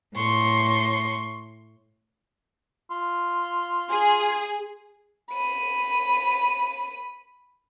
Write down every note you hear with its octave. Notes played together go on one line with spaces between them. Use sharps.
A2 C6 C#6
F4
G#4
B5 D#7